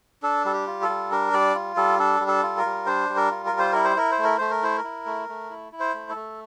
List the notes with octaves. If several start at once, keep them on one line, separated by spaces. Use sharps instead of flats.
D4 A4
G3 A4
G4
F4
A4
G3
D4 A#4
G3 D5
F4
G3 A4
D4 A4
G3
A4
F4
A#4
G3
D4 C5
G3
A#4
F4
A#4
G3
C5
E4 A#4
C5
E4 A#4
C5
A3
A#4
A3 C5
A#4
E4 C5
A#4
E4
A3
A3
E4
E4
C5
A3
A4
A3